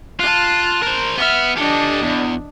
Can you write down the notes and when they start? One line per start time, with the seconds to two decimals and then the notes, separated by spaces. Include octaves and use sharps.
0.20 F4 A5 F#6
0.82 A#4 C5
1.18 B3 E5 F6
1.57 D4 G4 A4 D#5
2.02 E2